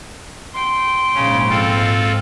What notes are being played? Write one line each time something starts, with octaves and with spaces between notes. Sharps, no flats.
G5 C6
A#1 G#2 C#3 C#4
C4 F4 A4